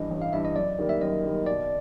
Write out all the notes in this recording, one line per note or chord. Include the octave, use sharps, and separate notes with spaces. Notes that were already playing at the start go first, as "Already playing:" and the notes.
Already playing: G2 E3 D#5
A1
F5
G2 E3 E5
D#5
F#2 D5
D#3 G3 A#3
E5
F#2 D#5
D#3 G3 A#3
B2 D5